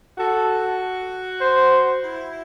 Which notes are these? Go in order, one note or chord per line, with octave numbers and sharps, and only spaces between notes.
F#4 A4
C5
E4